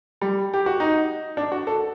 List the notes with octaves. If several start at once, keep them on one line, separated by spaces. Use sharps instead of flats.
G3
G4
F#4
D#4
D4
F#4
A4